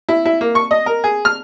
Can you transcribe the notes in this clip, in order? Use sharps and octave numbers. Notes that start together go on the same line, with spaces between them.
E4
E4
A#3
C#6
D#5
A#4
G#4
F6